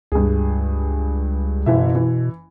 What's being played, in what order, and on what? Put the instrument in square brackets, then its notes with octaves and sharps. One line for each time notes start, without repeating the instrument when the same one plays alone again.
[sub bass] C#2 [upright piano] G2 G#4
[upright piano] F#1 E3 E5 [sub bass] B2
[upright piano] E3